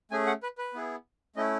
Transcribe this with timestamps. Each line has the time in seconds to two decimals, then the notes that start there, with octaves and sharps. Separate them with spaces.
0.11 A3 C#4 G#4 G#5
0.27 F#5
0.43 B4
0.58 B4
0.74 B3 E4 G#4
1.36 A3 C#4 E4 D#5